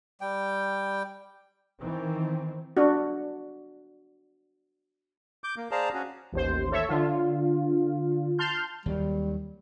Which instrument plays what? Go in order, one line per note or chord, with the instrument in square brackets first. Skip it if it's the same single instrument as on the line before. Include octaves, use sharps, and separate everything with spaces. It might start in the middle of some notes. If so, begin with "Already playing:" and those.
[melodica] G3 G5
[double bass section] D#3 E3 C4
[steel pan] D4 F#4
[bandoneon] D6 G6
A#3
G#4 C5 D5 F5 A5 A#5
C#4 F#4
[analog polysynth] A1 D#2 C5
A4 C#5 E5
D3 F4
A5 C6 F6 G6
[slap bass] D#2 D#3 F#3 [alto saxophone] G3